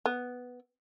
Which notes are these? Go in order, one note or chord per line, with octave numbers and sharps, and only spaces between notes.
B3